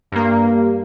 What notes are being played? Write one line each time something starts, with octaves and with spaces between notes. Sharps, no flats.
G2 A#3